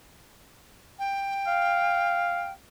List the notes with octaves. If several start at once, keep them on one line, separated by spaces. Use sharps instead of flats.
G5
F5